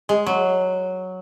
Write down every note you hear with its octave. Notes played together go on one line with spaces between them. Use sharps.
G#3
F#3